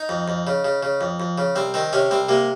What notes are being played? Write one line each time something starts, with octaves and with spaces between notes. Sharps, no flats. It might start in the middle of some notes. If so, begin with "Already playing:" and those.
Already playing: D#4
F2
F2
C#3
C#3
C#3
F2
F2
C#3
C2 C4
D#3 C4
C3 C#4
C2 C4
C3 A#3